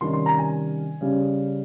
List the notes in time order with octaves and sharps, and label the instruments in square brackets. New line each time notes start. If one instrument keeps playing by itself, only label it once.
[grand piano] C3 D#3 G3 C#4 C6
C6
A#5
G#5
C#3 G3 C#4